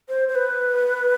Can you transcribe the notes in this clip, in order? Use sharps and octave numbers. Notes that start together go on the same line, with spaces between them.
C5
C5
B4